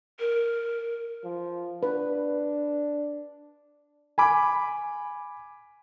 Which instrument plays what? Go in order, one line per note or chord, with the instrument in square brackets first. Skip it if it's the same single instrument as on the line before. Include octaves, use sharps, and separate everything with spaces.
[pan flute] A#4
[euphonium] F3
[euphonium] D4 [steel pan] B4
[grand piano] G#5 B5 D6